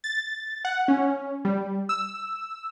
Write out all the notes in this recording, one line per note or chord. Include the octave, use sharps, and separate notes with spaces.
A6
F#5
C#4
G3
E6